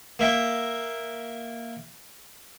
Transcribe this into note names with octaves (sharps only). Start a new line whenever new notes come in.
A#3 E5 G5